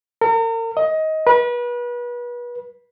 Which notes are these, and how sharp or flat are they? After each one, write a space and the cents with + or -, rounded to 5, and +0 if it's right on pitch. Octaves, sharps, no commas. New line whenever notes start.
A#4 -40
D#5 +20
B4 -30